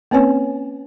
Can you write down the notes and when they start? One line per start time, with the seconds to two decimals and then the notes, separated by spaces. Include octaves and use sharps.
0.11 A#3 C4 C#4 B4 C#5 G#5